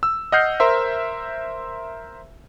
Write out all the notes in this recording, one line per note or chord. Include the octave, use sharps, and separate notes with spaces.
E6
D#5 F#5 F6 G6 C7
A#4 C5 E5